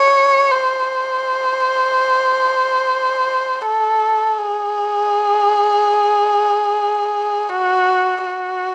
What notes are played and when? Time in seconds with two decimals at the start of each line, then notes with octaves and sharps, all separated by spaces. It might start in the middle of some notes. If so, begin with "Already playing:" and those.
Already playing: C#5
0.52 C5
3.62 A4
4.39 G#4
7.49 F#4
8.26 F#4